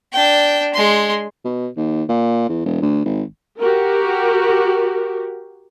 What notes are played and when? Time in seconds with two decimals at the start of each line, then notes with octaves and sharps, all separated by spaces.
0.13 D4 G5
0.74 G#3 C6
1.45 B2
1.77 D#2
2.09 A#2
2.49 E2
2.66 E1
2.82 D2
3.06 G#1
3.59 F#4 G4 A#4